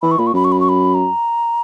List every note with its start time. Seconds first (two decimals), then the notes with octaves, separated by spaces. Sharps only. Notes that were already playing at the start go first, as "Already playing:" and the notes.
0.02 E3 B5
0.11 C#6
0.18 A#2 B5
0.27 C#6
0.33 F#2 B5
0.44 C#6
0.52 B5
0.60 C#6
0.69 B5
0.94 A#5